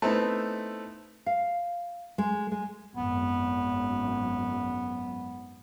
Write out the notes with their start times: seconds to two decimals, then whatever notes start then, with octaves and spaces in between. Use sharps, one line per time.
0.02 A3 B3 C4 D#4 E4
1.26 F5
2.18 G#3
2.51 G#3
2.96 G#1 F#2 B3